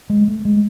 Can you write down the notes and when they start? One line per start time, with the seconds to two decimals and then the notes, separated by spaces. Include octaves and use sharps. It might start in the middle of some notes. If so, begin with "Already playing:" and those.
0.10 G#3
0.28 A3
0.45 G#3